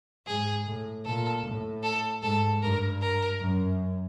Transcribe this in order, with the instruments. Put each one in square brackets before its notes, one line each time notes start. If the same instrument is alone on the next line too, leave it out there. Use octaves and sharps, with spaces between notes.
[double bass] G#2 [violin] G#4
[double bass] A2
[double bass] A#2 [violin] A4
[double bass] A2
[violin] A4
[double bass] G#2 [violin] A4
[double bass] G2 [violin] A#4
[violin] A#4
[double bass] F#2